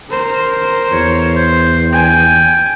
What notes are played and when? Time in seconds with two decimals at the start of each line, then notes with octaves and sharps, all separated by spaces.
0.10 A#4 C5
0.92 E2 C#5
1.36 C5
1.93 G5 G#5